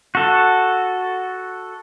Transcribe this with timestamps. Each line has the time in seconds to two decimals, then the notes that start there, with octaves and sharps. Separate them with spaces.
0.15 F#4 A4